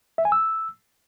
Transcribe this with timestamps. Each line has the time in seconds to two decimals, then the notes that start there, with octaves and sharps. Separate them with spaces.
0.18 E5
0.25 G#5
0.32 E6